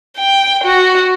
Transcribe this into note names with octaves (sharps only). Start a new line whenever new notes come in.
G5
F#4